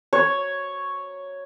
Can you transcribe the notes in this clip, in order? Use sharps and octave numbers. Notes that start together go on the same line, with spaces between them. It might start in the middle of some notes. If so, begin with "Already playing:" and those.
C#5